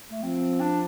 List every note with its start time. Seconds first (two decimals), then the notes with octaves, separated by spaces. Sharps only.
0.11 A3
0.23 F3 C4
0.60 D4